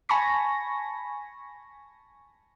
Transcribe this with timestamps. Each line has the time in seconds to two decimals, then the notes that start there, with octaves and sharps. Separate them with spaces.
0.09 G#5 A5 B5 C#6 A#6